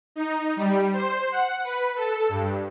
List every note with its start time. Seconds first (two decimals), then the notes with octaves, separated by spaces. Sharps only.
0.16 D#4
0.56 G3
0.93 C5
1.32 F#5
1.64 B4
1.96 A4
2.29 G2